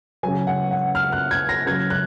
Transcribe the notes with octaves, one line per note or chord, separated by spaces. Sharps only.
C#3 F#3 G#5
F#5
F#5
F6
F#6
G#6
A#6
C#3 F#3 G#6
F#6